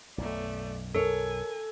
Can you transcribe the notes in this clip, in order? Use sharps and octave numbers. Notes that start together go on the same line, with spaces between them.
B1 F#2 A3 D5
A4 A#4 C#5 G#5